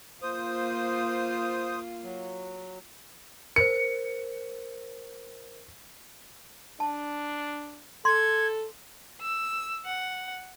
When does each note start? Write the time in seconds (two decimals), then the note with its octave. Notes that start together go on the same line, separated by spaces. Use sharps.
0.22 A#3 F4 C5 D#6
2.04 F#3
3.56 A#4 C5 C#7
6.80 D4 A5
8.05 A4 C6 G#6
9.22 E6
9.85 F#5